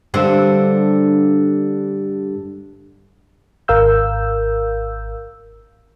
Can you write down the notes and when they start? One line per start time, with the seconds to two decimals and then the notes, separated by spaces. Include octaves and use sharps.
0.14 G2 D3 C4
3.68 G#1 A#4 F5 E6 G6